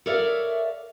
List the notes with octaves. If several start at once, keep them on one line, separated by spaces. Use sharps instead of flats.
A4 A#4 C#5 D5 E5 F5